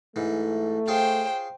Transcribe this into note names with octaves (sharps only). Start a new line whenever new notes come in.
G#2 E3 A3
F4 G#4 C5 C#5 G5